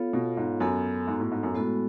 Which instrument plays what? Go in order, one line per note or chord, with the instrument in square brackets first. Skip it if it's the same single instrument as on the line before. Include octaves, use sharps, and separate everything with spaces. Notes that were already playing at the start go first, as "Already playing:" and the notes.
Already playing: [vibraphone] B3 F4 A4 C#5 F5
[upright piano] B2
G#2
[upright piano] F#2 [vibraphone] B3 F#4 A4
[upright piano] G#2
A2
G#2
F#2
[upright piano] A2 [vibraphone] G#3 B3 F#4 A4